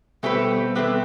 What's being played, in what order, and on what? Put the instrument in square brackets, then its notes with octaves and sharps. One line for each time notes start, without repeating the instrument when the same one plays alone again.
[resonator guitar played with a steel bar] B2 A3 C4 G4 B4 [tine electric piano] G3 B3
[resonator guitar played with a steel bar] B2 A3 C4 G4 B4